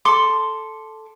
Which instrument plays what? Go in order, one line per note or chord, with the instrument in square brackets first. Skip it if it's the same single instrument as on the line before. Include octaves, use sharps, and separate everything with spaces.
[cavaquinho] A4 C6 D6